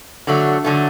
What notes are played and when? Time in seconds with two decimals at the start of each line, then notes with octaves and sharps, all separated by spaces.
0.27 D3 F#3 A3
0.65 D3 F#3 A3